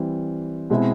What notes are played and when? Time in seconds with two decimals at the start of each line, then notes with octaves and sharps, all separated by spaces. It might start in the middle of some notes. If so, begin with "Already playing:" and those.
Already playing: E3 G3 C4
0.70 B2 G#3 C4 E4